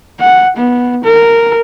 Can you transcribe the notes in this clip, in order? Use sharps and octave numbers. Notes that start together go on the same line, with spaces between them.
F#5
B3
A#4